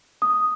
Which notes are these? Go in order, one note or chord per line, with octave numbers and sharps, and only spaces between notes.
D#6